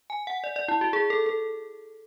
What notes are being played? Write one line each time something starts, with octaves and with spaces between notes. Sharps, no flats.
G#5
F#5
D5
D5
E4
F#4
G#4
A4
A4